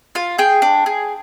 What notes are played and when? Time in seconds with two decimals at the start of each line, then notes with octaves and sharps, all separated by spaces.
0.15 F4 F5
0.38 G#4 G5
0.62 D4
0.86 G#4